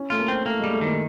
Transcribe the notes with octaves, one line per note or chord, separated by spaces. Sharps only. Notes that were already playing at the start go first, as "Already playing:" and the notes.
Already playing: C#4
A3 F4
A#3
C4
A3 A#3
G3 G#3
A3
D#3 A#3